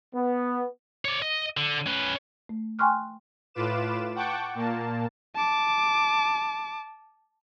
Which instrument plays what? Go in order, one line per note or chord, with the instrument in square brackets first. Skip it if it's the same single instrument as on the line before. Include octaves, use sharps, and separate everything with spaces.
[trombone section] B3
[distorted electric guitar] C#5 D5
D#5
D3
C#4 B4
[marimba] A3
G5 G#5 C6 C#6 F6 F#6
[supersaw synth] A2 F4 B4 D6 E7
F#5 G5 A5 C#6 D6
A#2 A#3 A5
[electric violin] A5 D6